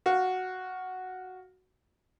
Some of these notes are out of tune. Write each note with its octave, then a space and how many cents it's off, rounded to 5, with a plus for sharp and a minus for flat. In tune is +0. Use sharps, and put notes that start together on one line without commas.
F#4 +0 F5 +20